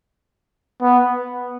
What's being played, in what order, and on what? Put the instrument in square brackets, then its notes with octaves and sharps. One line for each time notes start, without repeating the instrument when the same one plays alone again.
[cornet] B3